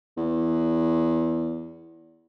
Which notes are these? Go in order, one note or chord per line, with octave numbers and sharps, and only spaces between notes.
E2